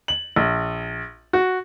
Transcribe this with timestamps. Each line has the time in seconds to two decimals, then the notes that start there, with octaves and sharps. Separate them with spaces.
0.08 F#7
0.36 A#1
1.33 F#4